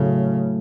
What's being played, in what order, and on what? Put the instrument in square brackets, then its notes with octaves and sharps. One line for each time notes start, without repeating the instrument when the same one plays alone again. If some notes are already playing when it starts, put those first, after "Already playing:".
Already playing: [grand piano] A2 F#3 A3 [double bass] C#3